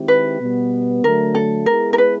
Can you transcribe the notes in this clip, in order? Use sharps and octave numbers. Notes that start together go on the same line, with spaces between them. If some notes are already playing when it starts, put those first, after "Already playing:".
Already playing: D#3 G#3 C4 E4 G4
B4
B2 G3 B3
D3 F#3 A3 A#4
A4
G#3 B3 E4 G#4 A#4
A#4
B4